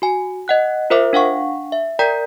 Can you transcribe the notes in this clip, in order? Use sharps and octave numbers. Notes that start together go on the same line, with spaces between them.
F#4 G#5
D#5 F#5 F#6
F4 A#4 C5 E5 D6
D4 F5 F#5 C#6
E5
A#4 D5 G5 A#5 G6 B6